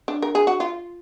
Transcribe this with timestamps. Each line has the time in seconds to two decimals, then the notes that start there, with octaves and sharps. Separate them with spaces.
0.08 D4
0.22 A#4
0.35 G#4
0.47 F#4
0.60 F4